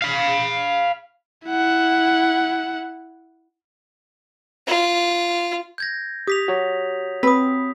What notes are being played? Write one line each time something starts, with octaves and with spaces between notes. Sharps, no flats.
F5 B5
E4 F#5
F4
G6 G#6 A#6
G4 D#6 B6 F7
F#4 C#5
C4 B4 D#6 B6